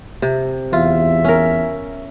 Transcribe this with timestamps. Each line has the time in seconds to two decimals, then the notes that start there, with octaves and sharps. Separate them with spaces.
0.22 C3
0.73 E2 F4 E5
1.25 C#4 A#4